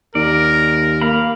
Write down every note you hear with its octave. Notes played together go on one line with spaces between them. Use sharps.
D#2 A#4 D5
A#3 F5 B5